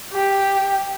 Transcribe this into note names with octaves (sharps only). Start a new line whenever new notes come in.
G4